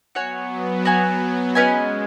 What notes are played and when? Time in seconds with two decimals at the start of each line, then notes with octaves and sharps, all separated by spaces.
0.15 F#3 B3 F#4 C#5 G#5
0.85 F#4 C#5 G#5
1.55 G#3 C#4 B4 D#5 G#5